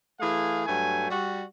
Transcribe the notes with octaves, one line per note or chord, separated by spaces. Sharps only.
E3 A3 G#4 F5
G2 F#3 A3 G#5
G3 F#4